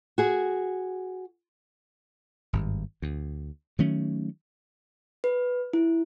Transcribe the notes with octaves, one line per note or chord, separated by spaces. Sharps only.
F#4 G#4
G#1 G2
D2
D#3 F#3 A3 C#4
B4
E4